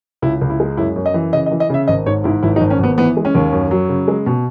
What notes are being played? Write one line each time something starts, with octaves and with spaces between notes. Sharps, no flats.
C#2 E4
C#2
E4
G#3
F#2 E4
F#2
D#5
E3
C#3 D#5
D#5
E3
D#5
C#3 E5
G#1 D#5
G#2 C#5
G#2 E4
G#1 E4
D#4
G#1
C#4
G#1 B3
E3 B3
G#3
C#4
D#2
F#2
F#3
C#3
G#3
B2